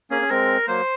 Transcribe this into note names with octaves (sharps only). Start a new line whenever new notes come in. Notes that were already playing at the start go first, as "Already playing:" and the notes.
A#3 C#4 G#4
C#4
G#3 C4 A#4
F#3 A#3 C5